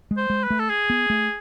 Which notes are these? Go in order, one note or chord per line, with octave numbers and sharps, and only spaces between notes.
G#3
C5
G#3
B4
A3
A4
G#4
B3
A3